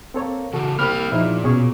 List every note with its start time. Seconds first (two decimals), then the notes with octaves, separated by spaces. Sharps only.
0.14 A#3 C4 A4 C#5
0.53 C#3 E3 F#4 A4
0.79 C2 A#3 G5 B5 F6 F#6
1.12 E2 A#2 F3 D#4 E4
1.44 B2 C#4 G#4 C#6